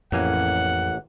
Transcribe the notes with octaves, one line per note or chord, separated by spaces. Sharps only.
A1 F2 A#3 F#5 G#5